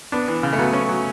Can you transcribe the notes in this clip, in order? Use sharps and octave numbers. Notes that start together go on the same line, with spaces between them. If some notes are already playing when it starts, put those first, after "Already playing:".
B3 D4
E3
C#3
A3
F#3 B3
C#4
F#3